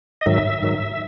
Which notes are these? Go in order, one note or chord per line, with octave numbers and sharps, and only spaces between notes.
D#5
G#2 D#3 F#3 E5
G#2 D#3 F#3